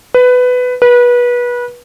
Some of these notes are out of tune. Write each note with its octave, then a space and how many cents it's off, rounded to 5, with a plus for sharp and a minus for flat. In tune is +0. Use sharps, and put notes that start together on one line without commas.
B4 +15
B4 -25